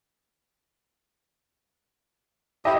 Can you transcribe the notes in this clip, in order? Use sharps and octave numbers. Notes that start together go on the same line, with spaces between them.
E4 G4 D#5 E5